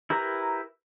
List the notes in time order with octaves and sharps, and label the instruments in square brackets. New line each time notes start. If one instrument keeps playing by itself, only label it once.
[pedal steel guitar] E4 G4 A#4 B4 A#5